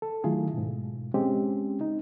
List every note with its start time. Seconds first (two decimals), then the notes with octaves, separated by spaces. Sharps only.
0.02 A4
0.24 D#3 F#3 A3 E4 F4 G#4
0.54 G#2 B2
1.14 G#3 C4 C#4 G4
1.81 D#4